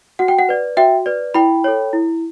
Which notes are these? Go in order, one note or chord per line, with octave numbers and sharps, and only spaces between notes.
F#4 F#5
G5
F#5
B4 D5
F#4 E5 G5
B4 D5
E4 G5 B5
A4 C#5
E4